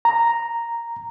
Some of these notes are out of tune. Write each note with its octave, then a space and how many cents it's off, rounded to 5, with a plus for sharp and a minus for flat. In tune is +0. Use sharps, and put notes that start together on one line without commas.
A#5 +0